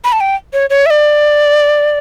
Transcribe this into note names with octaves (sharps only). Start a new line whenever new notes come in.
B5
A5
G5
C#5
C#5
E5
D5